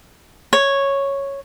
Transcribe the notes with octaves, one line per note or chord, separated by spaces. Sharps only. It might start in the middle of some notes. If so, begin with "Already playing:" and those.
C#5